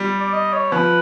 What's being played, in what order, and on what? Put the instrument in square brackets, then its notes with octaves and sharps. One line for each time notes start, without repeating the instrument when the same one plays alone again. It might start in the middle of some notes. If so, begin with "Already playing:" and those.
Already playing: [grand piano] G3
[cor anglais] D5
D#5
C#5
[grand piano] F3 [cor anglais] B4